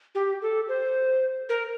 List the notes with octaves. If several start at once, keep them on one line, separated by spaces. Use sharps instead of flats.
G4
A4
C5
A#4